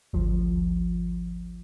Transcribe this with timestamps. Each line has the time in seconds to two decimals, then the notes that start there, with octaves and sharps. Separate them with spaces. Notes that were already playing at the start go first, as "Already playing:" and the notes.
0.13 G#1 D2 F3